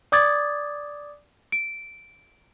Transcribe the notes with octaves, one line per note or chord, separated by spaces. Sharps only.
D5 D6 D#6 G#6 A6
D7